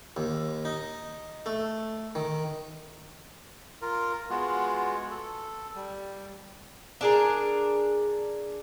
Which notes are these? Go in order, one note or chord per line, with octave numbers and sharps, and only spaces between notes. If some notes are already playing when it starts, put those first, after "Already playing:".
D#2
D#4
A3
D#3
F4 A#4
G#3 B3 F4 F#4
A4
G3
D4 G#4 A#4